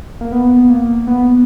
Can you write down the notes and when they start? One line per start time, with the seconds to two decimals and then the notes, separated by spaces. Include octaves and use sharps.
0.21 A#3
0.32 B3
0.70 A#3
1.07 B3